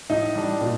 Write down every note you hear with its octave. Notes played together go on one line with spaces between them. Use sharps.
A2 D#4
G3 D4
A#2